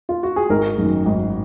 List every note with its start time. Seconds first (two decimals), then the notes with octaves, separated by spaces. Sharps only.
0.09 F4
0.23 F#4
0.36 G#4
0.49 G#1 F#4 A#4
0.78 F#2 D#3
1.06 G#1